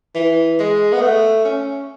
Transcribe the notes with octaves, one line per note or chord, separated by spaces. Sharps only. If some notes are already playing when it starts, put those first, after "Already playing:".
E3
G#3
B3
A3
C#4